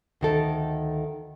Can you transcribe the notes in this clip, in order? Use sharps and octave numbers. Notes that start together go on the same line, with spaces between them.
D2 D#3 A4